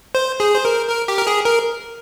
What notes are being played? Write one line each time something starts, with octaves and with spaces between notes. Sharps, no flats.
C5
G#4
C5
A#4
A#4
G4
A#4
G#4
A#4